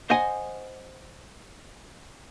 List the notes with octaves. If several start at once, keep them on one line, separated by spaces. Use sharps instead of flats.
C5 D#5 F#5 G#5